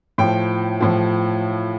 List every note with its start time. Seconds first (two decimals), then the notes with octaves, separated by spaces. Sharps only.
0.18 A2 F3 G5
0.80 A2 F3